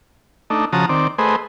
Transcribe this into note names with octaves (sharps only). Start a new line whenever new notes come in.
A3 D4 D#4
C#3 F3 F#4 A5 A#5 D#6
D#3 C4 D5
A3 G#4 B4 C5 D#5